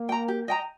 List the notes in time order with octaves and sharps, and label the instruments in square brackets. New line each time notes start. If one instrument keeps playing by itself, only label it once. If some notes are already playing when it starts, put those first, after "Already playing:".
Already playing: [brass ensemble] A#3
[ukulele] G5 A#5
G4
D#5 G5 A#5